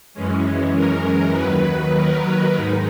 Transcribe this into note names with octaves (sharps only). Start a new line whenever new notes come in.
F#2 E3 G#3 C#4
A#4
D#2 D#3 F#3 B4
A#4
G#2 D#3 G#3 D#4